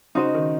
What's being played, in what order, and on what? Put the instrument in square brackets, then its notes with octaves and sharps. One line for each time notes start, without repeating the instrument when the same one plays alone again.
[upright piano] C#3 [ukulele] D#4 F#4 C5 D#5
[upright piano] D#3